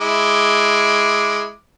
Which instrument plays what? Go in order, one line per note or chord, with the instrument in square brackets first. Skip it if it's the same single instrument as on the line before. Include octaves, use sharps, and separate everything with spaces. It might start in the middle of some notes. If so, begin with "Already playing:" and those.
[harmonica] G#3 E4 D6